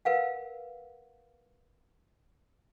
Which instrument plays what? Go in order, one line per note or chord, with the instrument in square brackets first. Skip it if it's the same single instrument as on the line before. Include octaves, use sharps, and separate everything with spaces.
[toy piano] A#4 B4 F5 F#5